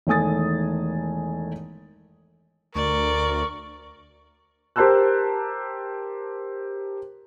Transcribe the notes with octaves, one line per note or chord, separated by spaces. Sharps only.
E1 D#3 A3 G#5 D#6 A6
D2 A#4 D5 C#6
G4 A#4 C5 A5 E6 F#6